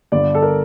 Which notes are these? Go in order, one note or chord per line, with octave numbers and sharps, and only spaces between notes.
G1 G2 D3 D5
A4
A#4